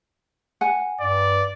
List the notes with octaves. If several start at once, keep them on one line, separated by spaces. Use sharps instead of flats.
F#5 G#5
G2 D5